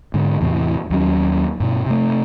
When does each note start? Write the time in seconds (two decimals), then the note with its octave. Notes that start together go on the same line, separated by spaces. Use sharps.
0.14 G#2 D3
0.41 E2 A2 C3 E3
0.90 D#2 F#3 C#4
1.60 G2 B2
1.86 C3 A3